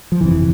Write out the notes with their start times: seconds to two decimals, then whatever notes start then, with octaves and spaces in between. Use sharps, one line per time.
0.12 F3
0.21 G1 F2 C3 E3